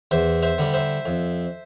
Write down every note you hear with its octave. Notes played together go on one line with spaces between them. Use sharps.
E2 C5 E5
C5 E5
D3 G3
C5 E5
F2